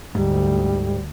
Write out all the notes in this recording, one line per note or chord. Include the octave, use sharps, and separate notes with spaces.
D2 G#2 G3